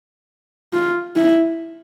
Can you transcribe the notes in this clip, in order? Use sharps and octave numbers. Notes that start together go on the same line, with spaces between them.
F4
E4